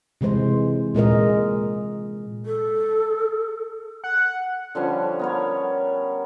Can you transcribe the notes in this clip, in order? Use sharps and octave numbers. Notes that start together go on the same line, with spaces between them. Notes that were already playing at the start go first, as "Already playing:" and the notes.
C3 E3 G#3 C5
A#2 G#3 A#4 D#5
A4
F#5
D3 F3 G3 C#4
B3 A#4 C#5